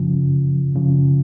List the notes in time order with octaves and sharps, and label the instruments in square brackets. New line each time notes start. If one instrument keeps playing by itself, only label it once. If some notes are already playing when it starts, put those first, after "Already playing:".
Already playing: [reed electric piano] F#2 C#3 F3
F#2 C#3 F3